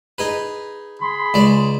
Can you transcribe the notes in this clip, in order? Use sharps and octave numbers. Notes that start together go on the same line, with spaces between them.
D#4 G#4 B4
G#4 B5 C6
C#2 G#3 D5